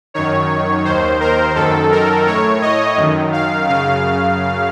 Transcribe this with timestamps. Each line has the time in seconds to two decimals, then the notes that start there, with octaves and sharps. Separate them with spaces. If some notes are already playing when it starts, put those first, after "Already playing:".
0.14 F#2 D#3 C#5
0.85 D#2 D#3 C5
1.20 A#4
1.56 F#2 D#3 A4
1.91 A#4
2.27 A2 C#5
2.62 D#5
2.96 F#2 D#3
3.33 F5
3.68 F#2 C#3 F5